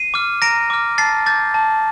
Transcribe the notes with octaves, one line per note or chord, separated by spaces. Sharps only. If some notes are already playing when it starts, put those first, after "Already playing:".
Already playing: C7 D#7
D6 F6
A#5 A#6 D7
D6 F6
A5 A6 C7
D6 G6 A6
A5